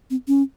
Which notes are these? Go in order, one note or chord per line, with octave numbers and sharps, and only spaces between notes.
C4
C#4